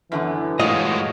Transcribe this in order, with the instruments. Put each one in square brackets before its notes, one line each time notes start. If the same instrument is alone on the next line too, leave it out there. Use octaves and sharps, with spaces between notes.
[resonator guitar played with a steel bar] F#2 D3 B3 [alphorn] E3
[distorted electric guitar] A2 G#3 [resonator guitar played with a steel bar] F4 F#4 C#5 [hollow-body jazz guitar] D#5